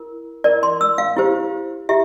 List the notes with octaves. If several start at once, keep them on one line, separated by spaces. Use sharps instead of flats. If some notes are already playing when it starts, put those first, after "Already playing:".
Already playing: E4 A#4
E4 A#4 D5
C6
E6
F5
E4 G4 C5
E4 G4 E5